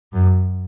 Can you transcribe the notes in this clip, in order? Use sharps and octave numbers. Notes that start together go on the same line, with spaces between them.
F#2